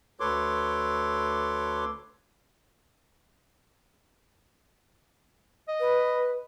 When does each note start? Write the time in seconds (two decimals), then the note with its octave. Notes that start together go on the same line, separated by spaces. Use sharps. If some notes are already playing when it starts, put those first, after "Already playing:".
0.20 D2 A4 B4 C#5 C6 D6
5.69 D#5
5.80 B4